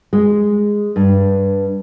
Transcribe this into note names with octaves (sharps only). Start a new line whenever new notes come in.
G#3
G2